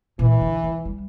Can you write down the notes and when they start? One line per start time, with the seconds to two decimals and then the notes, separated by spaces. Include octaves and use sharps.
0.19 A#2 E3
0.41 D3
0.64 F3
0.85 G3